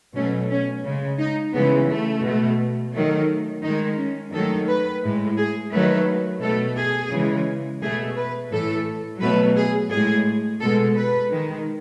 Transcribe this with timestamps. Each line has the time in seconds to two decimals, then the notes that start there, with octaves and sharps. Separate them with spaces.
0.15 B2 F#3 A3 C#4
0.50 C#4
0.84 C#3 G#3
1.19 D#4
1.53 C#3 E3 G#3 B3
1.89 A3
2.24 B2 A3
2.94 D#3 F#3 A3
3.63 D#3 G#3 D#4
3.98 C#4
4.33 D#3 F#3 A3 A4
4.68 B4
5.03 A2 G#3
5.38 G#4
5.72 D#3 F#3 A3 B4
6.42 B2 A3 A4
6.78 G#4
7.12 C#3 E3 G#3
7.82 B2 A3 G#4
8.16 B4
8.52 A2 E3 A3 A4
9.21 B2 F#3 A3 B4
9.56 G#4
9.91 A2 G#3 G#4
10.60 B2 G#3 A4
10.96 B4
11.31 D#3 G#3